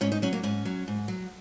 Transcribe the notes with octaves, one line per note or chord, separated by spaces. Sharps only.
G#2 C#4
D#4
F#3 C#4
A#3
G#2 C#4
F#3
G#2
F#3